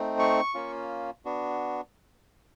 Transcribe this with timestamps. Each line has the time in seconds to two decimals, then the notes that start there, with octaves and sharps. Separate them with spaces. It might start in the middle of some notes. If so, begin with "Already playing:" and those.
Already playing: A3 C4 D#4
0.19 C#6
0.54 A#3 C#4 F4
1.25 B3 D4 F#4